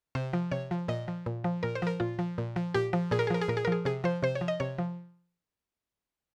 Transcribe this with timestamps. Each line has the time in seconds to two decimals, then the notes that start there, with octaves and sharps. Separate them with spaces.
0.15 C3 C5
0.33 F3
0.52 C3 C#5
0.71 F3
0.88 A#2 D#5
1.08 F3
1.26 A#2
1.44 F3
1.63 A#2 A#4
1.75 C5
1.82 F3 A#4
2.00 A#2 F4
2.19 F3
2.38 A#2
2.56 F3
2.74 A#2 G4
2.93 F3
3.11 A#2 G#4
3.19 A#4
3.27 G#4
3.30 F3 A#4
3.41 G#4
3.48 A#2 A#4
3.57 G#4
3.65 A#4
3.67 F3 G#4
3.85 C3 G#4
4.04 F3 C5
4.23 C3 C5
4.35 C#5
4.41 F3
4.48 D#5
4.60 C3 C#5
4.78 F3